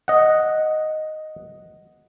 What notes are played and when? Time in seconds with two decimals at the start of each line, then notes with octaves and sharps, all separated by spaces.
0.08 D#5 F#5